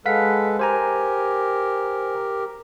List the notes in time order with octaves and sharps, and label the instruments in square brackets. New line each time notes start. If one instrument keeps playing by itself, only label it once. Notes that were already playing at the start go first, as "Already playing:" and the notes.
[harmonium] G#3 A4 B4 [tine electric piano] F5 F#5 B6
[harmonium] G4 A#4 [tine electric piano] C5 G#5 A#5